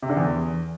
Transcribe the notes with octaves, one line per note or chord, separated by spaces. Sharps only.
C3
D3
E2